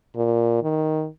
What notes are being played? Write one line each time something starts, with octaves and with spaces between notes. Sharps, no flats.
A#2
D#3